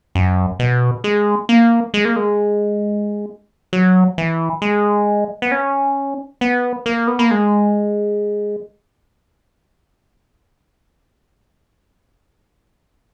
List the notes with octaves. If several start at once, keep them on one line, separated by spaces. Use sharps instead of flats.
F#2
B2
G#3
A#3
G#3
A#3
G#3
F#3
E3
G#3
B3
C#4
B3
A#3
B3
A#3
G#3